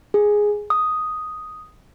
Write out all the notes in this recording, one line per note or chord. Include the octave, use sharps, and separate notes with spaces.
G#4
D#6